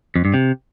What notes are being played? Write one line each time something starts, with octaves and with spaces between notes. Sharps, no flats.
F2
G2
C3